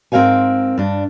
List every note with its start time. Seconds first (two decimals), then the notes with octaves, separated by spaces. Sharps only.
0.12 G#2 C4 A#4 C#5 F5 G#5
0.78 G2 D4